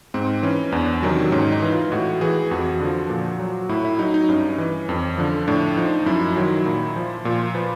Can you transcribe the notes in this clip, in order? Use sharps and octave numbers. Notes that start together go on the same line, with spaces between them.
G#2 C4
E3 C#4
E2 D4
C3 D#3 F#3
G#2 C#4
D#4
E3
F4
A2 F#4
E3 G#4
F2 F#4
D3 F3
A#2
F#3
A2 E4
E4
F#3 D#4
D#4
G2 C#4
E3
F2
D3 F3
A2 D4
F3 D#4
F#2 E4
D#3 F#3
A#2
F3
A#2 F4
F3 B4